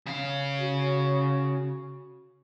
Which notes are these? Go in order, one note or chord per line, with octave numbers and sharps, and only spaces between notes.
C#3 F5
F#4